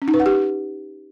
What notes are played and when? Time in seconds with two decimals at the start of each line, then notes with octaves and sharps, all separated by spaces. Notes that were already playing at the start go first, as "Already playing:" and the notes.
0.02 C#4
0.08 D#4
0.14 B4
0.20 F#5
0.26 G4